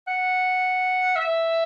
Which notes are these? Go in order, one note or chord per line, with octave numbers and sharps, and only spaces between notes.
F#5
E5